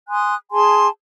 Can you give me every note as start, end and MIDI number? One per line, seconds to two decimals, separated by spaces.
0.08 0.34 80
0.08 0.34 84
0.08 0.34 87
0.08 0.34 90
0.52 0.88 68
0.52 0.88 80
0.52 0.88 81
0.52 0.88 84